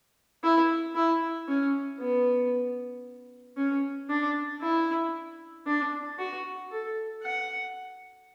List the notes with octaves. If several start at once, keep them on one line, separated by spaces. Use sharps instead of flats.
E4
E4
C#4
B3
C#4
D4
E4
D4
F#4
A4
F#5